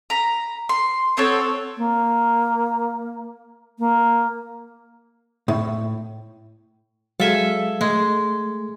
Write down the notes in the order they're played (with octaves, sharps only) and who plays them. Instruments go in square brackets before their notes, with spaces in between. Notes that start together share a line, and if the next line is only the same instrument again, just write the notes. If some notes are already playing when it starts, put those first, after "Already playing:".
[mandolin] A#5 B5
C6
B3 C4 A4 C#5
[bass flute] A#3
A#3
[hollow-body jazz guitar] A2
[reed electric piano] F#3 G#3 F5 [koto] A4 E5 G#5
[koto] G#3 [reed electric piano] A3